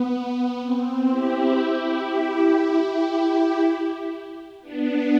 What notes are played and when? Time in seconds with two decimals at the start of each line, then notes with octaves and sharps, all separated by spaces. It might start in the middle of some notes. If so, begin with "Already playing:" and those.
Already playing: B3
0.60 C4
1.09 E4 G4
1.60 E4 G4
2.10 E4 G4
4.62 B3 D4